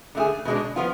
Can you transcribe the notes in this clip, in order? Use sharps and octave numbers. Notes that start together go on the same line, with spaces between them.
D3 A3 E4 G#4
B2 G#3 D4
F3 B3 F4